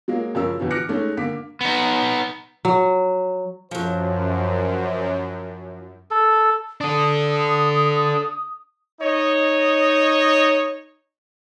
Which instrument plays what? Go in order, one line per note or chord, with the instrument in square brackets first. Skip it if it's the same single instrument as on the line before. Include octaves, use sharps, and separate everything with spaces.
[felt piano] F#3 G#3 A#3
F#2 C#3 F3 C#4 A#4 E6
E2 B2 D3 E3 F3
D6 F6 F#6 A#6 C#7
G#3 A3 C#4 D#4 A4
D3 A#3 D6 B6
[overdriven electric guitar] B3 D#4
[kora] F#3
[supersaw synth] F#2 [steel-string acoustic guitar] F3 F#3 [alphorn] C5
[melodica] A4
[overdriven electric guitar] D4 A4 [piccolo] D#6
[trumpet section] D#4 C#5 D#5